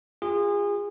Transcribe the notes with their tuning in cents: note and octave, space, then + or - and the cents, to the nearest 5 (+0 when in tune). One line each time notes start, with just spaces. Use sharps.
F4 +0 G#4 -30